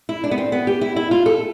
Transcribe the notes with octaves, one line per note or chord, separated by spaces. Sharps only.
E4
D4
B3
C4
B3
G4
E4
E4
F4
A4